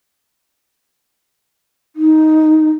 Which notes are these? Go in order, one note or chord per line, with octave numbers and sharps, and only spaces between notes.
D#4